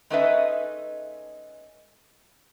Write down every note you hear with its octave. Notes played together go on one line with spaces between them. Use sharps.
G#3 C#4 D#4 A4 B4 E5